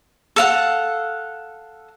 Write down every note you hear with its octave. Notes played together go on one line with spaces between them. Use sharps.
A4 F5 F#5